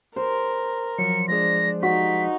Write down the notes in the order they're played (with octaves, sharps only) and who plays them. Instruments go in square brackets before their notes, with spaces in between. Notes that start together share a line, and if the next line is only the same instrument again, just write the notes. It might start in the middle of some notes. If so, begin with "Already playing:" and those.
[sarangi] A#4 [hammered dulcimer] C5
[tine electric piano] F3 F#3 [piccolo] C#7
[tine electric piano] F3 G#3 G#4 [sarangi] D4 [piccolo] A#6
[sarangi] D#4 [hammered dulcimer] F#4 [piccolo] B6